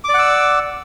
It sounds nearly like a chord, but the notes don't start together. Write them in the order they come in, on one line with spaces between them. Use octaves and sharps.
D6 D5 F#5 E6